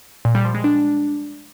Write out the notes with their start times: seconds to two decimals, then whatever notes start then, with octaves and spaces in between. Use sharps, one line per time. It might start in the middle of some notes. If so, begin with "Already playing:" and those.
0.25 A#2
0.35 G3
0.45 F3
0.54 G#3
0.64 D4